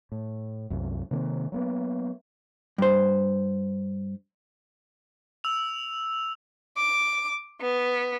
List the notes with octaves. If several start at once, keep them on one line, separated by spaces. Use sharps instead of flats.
A2
C2 F#2
C3 D#3 A#3
F#3 A#3 B3
G2 C5
E6 F7
D6
B3